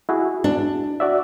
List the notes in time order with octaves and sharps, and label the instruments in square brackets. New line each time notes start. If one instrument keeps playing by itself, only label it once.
[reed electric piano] E4 F#4 G#4
[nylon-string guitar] D4
[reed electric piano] F#4 D5 E5